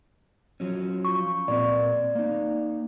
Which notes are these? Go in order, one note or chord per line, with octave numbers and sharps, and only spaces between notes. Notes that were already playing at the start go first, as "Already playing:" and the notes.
F3 F#3 C#4
F4 C#6
A#2 A#3 C4 D5
A#3 D#4